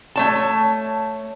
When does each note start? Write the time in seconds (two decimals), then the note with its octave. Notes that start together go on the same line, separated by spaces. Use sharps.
0.16 A3 C#5 A5